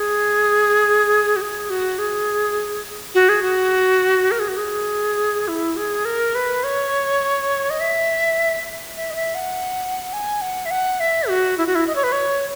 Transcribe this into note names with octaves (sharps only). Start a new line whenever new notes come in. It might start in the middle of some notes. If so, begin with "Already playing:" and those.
Already playing: G#4
F#4
G#4
F#4
G#4
F#4
G#4
F#4
A#4
G#4
F#4
G#4
E4
G#4
A#4
B4
C#5
D#5
E5
E5
D#5
E5
F#5
G#5
F#5
E5
F#5
E5
F#4
E4
F#4
E4
D#5
C#5
B4
C#5